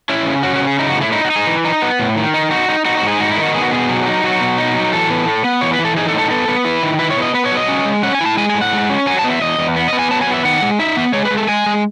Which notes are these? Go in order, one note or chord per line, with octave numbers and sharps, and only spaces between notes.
C#4 E4
C#3
C#4 F#4
F#4
C#3
G#4
D#4 E4
F#4
A2
E4
D#4 E4
F#4
D#4
G#4
E3
D#4
B3
A2
D#3
D#4
D#4 F#4
D#4
D#4 F#4
F#4
G#2
G#4
D#4 F#4
E4
D#3
F#4
B3 G#4
F#4
B2 G#4
F#3
D#4
F#3 F#4
B2
D#4
F#3
E3 A4
B3
A2
B3
E3 C#5
B4
E3
A4
D#4 G#4
A4
A2
A4
B3 A4
B3
E4 B4
D#3
E4 B4
C#5
B3
D#5
B3 B4
C#5
F#3
D#5
C#4
G#3
C#4 F#5
G#5
E4 A5
G#3 G#5
G#5
A2
F#5
G#3
C#4
F#3 G#5
A5
B3 D#5
E5
E2 D#5
E2
B3
D#5
B3
G#5
F#3 A5
G#5
B3
E5
D#3 F#5
G#3
D#4 E5
B3
G#3 C#5
B4
G#3
A4
G#3 G#5
G#3